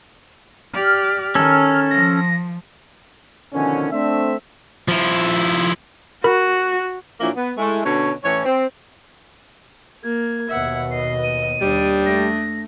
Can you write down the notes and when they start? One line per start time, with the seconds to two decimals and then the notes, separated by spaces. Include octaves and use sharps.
0.73 G4 D5 F6
1.35 D#3 C#4 A4
1.91 F3 A#6
3.53 B2 D3 D#3 F3 C#4
3.91 A3 C4 D4 E5
4.88 F3 E4
6.24 F#4 A#4 B5
7.21 A#2 F3 F#3 A#3 D4 E4
7.36 B3
7.58 G#3 A3 E4
7.86 B2 D3 C#4 C#5
8.24 A2 E3 C#4 C#5
8.44 C4
10.03 A#3 G#6
10.49 D#2 B2 B3 E5 F#5
10.91 D#5 C7
11.24 D#7
11.61 D#2 G3 D4 D#6
12.06 A3 A#6